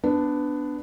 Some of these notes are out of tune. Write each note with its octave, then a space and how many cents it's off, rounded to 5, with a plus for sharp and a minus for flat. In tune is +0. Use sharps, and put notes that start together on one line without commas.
B3 +15 D4 +0